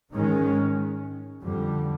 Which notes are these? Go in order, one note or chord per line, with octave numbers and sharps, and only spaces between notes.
G#2 D#3 G#3 C#4
F2 D3 G3